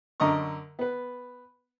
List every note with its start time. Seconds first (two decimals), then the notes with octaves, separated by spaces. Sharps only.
0.20 F#2 D3 D#5 A#5 C#6
0.79 B3 B4